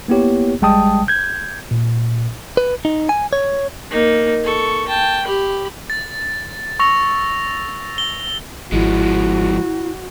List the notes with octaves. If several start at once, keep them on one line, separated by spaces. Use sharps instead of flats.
A#3 B3 E4 G4 C#5
A1 G3 G#3 G5 A5 D#6
G6 G#6
A#2
B4
D#4
G#5
C#5
A#3 D#4
A4 C#6
G5 A5
G4 B5
A6
C#6 E6 A#6 F7
G7
G#1 F3 G#3 E4 F#4